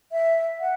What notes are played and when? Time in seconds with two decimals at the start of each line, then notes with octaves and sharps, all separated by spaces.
0.12 E5
0.60 F#5